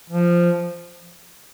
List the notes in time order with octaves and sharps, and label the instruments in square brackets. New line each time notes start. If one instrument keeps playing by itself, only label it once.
[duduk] F3